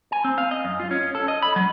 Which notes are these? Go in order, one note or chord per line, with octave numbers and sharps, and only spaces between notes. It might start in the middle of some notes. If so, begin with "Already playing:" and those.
G#5
C4
F5
D#5
F#2
F4
C#4
A4
D#5
B5
F#3